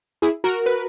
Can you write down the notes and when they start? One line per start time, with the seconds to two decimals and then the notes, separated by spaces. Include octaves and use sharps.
0.22 E4 G#4
0.44 F#4 A#4
0.66 B4